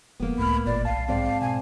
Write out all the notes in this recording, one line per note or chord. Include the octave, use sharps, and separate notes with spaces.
E1 A#3 B3
C#2 A2 B5 F6
G1 A#2 D5
B1 F5 A5
G#2 C4 D5 F5
B2 G#5